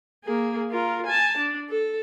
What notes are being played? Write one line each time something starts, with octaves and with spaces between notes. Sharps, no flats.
A#3 G#4
F4 A#4
G#5 A5
D4
A4